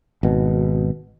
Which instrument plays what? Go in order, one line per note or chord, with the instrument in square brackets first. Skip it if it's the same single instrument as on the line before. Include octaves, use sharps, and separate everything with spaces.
[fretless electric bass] G#1 B2